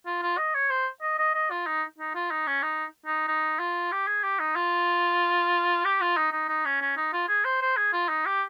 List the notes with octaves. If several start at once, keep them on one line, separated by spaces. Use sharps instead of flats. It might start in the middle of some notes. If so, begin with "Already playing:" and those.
F4
F4
D#5
C#5
C5
D#5
D#5
D#5
F4
D#4
D#4
F4
D#4
C#4
D#4
D#4
D#4
F4
G4
G#4
G4
D#4
F4
G4
F4
D#4
D#4
D#4
C#4
C#4
D#4
F4
G#4
C5
C5
G#4
F4
D#4
G4